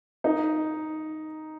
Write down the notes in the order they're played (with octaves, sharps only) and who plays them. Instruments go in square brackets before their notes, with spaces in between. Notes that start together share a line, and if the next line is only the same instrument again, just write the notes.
[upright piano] D#4